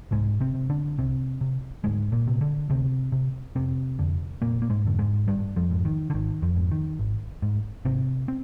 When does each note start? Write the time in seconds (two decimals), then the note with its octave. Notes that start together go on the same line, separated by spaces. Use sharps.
0.11 C2 G#2 G#3
0.40 C3 C4
0.54 C3
0.70 D3 D4
0.98 C2 C3 C4
1.41 C3
1.84 D2 G#2 G#3
2.12 A#2 A#3
2.27 C3
2.41 D3
2.70 D2 C3 C4
3.12 C3
3.55 F1 C3 C4
3.99 F2 D3
4.42 F1 A#2 A#3
4.62 A#3
4.70 G#2 G#3
4.85 F2 D3
4.99 G#2 G#3
5.27 G#1 G2 G3
5.56 F2 F3
5.70 G#2
5.85 D#3
6.10 D3
6.14 G#1 D#3
6.42 F2 F3
6.56 G#2
6.71 D#3
6.99 G#1
7.42 G#2
7.85 G#1 C3 C4
8.28 C4